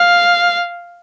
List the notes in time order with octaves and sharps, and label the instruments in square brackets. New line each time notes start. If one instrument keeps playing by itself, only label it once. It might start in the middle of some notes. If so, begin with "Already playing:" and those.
Already playing: [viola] F5